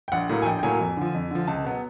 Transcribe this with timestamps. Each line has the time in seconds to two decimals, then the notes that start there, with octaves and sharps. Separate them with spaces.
0.08 G5
0.12 A#1 F#5
0.29 A2 F#3 A#3
0.42 G#5
0.46 A#1 G5
0.59 G5
0.63 A2 F#3 A#3 G#5
0.80 F2
0.97 D3 F3
1.15 F2
1.31 D3 F3
1.47 C#2 A5
1.64 B2 F#3 B3